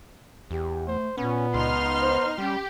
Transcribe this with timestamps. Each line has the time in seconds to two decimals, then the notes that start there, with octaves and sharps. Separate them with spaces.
0.51 E2 G4
0.87 A3 C5
1.17 A#2 B3 C#4
1.54 C#2 D#4 C6 F6
2.01 C5
2.38 G3 C#4 G4